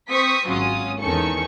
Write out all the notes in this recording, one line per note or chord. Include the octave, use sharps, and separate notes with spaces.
C4 C#6 D#6 B6
G#1 F#3 C#4 F4 D#6
E2 D#3 C#4 A4 C#6 C#7